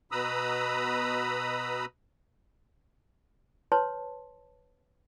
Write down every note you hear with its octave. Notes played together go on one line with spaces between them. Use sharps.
B2 B4 A#5 B5 D#6 E6
B4 C#5 A5 C6